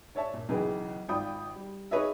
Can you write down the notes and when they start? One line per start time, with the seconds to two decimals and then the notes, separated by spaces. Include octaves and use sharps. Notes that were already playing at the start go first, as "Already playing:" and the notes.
0.15 D4 C#5 E5 A5
0.34 A#2
0.49 B1 C#3 E3 G#4 B4 G5
1.08 G#1 F4 D5 G5 B5 D#6
1.55 G3
1.91 D#4 G#4 B4 C#5 D#5 E5